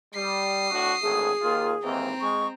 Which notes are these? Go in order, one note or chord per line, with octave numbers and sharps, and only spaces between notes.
G3 D#6 C7
A2 D4 F#4
G#1 D2 A2 G#4
D#2 A#3 F4
D#2 G#2 E3 C4 A#5
G#3 C#6